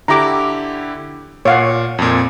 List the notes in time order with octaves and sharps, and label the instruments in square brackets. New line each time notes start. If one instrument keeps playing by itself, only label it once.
[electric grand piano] D3 E4 G4 [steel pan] A#5 D6
[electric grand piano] A#2 [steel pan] C#5 F5 F#5
[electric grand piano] F2 A#2